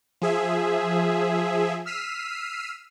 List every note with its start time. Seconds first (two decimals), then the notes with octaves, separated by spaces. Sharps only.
0.21 F3 G#4 E5
1.86 E6 F6 B6 C7 D#7